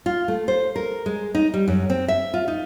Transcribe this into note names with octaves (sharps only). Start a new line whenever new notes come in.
F4
A3
C5
A#4
G#3
D#4
G3
F#2
C4
E5
F4
D#4